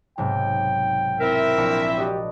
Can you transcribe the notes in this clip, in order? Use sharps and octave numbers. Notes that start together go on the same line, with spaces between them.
B1 G#2 C3 G5
C4 E4 A#4 E5
A#1 D4 C#7
F#4 G4 D5 D#5